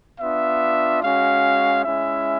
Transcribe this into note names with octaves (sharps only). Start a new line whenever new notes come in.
B3 D4 F4 E5
G#3 C#4 F#4 F5
G#3 C#4 E4 E5